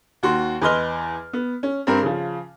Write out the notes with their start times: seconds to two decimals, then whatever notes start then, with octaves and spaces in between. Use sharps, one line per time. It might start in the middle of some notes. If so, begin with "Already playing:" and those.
0.23 D#2 F#4 C6
0.62 E2 B4 D#5 C6 F6 G7
1.33 B3
1.63 C#4
1.87 G2 C4 A#4
2.02 C#3 F3